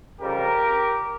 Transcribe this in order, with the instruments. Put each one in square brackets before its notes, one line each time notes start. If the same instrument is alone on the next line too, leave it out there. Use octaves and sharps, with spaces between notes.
[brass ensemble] F2 C#3 G3 G4 A#4